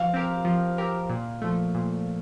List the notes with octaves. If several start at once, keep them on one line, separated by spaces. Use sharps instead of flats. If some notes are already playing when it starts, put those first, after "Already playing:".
Already playing: F3 F5
C4 G4 A#4
F3
C4 G4 A#4
A#2
F3 A3
A#2